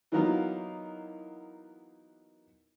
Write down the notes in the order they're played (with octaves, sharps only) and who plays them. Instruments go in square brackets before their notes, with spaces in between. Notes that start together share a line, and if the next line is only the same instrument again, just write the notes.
[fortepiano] E3 F#3 A#3 B3 D#4 F4